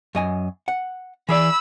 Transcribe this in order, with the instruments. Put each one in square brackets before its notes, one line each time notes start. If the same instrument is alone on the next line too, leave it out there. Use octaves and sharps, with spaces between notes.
[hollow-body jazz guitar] F#2 D#5 G#5
F#5
[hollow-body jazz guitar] E3 G#4 D5 [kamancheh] B5 E6